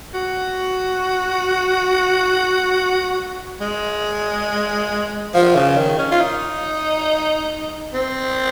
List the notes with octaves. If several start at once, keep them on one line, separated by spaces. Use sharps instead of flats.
F#4
G#3
F3
C#3
D#3
C#4
F4
D#4
C4